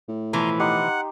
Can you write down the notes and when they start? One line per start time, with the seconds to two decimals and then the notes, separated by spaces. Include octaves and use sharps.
0.08 A2
0.33 B2 E3 F3 A#5 C6
0.59 D#4 G4 F#5 C6